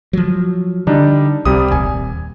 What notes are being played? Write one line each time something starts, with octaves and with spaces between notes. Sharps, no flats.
F3 F#3
D3 G3 D4 D#4
C2 C3 G3 D#6
D#1 G#5